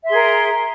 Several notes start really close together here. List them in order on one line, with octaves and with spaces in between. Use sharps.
E5 C6 G#4 A#4